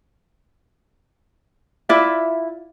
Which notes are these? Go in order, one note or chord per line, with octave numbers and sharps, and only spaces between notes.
E4 F4 D5 E5